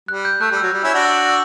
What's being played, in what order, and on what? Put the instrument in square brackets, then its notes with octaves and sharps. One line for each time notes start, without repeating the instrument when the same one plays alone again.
[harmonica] G3 [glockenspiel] F#6
[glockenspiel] G6
[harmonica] A3 [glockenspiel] F#6
[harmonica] G3
[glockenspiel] E6
[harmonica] F#3
G3
C#4 E4
D4 F#4
[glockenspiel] E6
E6